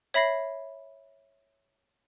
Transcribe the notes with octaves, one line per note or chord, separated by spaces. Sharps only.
C#5 E5 B5 A#6 C7